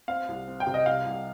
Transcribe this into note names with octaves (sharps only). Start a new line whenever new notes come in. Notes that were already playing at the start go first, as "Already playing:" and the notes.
C4 F5
C2
C4
G5
C3
D#5
C2 F5
C2